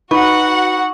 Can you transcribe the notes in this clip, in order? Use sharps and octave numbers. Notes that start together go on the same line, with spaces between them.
D#4 F#4 B4 F#5 C#6